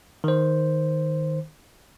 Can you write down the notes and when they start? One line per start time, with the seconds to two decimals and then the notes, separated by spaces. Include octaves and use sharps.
0.24 D#3 C5